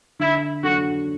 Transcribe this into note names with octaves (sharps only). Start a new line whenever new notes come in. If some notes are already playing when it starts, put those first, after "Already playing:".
D3 E4
F#3 D4 F#4 A4